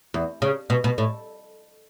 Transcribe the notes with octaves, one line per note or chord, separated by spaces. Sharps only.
E2
C#3
B2
B2
A2